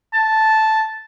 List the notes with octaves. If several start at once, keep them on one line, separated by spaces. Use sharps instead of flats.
A5